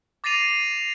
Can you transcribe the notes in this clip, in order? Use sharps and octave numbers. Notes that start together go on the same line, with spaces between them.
D6 A6 A#6 C7 D#7 F7